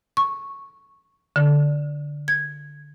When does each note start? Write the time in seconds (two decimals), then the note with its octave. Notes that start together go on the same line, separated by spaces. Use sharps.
0.17 C#6
1.36 D3
2.28 G#6